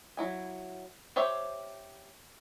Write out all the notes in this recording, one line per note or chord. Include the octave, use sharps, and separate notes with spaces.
F#3 E4 G#5
G4 C5 C#5 E5 G5